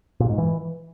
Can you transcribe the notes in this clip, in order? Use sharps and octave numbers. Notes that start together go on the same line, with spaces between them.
A#2
G#2
E3